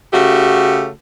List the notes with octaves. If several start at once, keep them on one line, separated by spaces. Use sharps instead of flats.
C#3 A3 F#4 G4